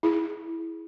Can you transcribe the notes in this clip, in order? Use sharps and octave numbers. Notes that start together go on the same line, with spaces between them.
E4 G#4